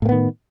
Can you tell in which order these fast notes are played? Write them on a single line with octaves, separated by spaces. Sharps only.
A2 A#3 B3 D#3